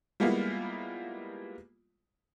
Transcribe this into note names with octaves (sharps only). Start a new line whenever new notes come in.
G3 G#3 A#3 B3 E4 F4